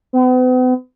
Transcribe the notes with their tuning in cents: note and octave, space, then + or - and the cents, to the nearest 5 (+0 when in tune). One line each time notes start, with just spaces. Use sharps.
B3 +45